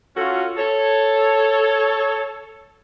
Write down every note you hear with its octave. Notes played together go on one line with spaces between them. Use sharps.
C#4 F4 F#4 A4
A4 C#5